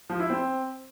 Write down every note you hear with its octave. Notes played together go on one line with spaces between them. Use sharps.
F3
E4
C4